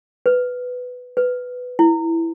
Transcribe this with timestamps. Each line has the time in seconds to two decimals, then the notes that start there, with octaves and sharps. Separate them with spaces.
0.26 B4
1.17 B4
1.79 E4